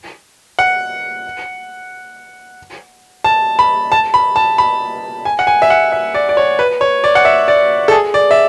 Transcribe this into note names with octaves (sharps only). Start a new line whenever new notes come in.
F#5
A5
B5
A5
B5
A5
B5
G#5
F#5
G#5
E5
F#5
E5
D5
D5
C#5
B4
C#5
D5
F#5
E5
D5
A4
G#4
D5
E5